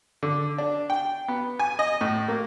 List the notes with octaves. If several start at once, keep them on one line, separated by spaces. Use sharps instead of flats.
D3
D4
G5
B3
G#5
D#5
A2
A#3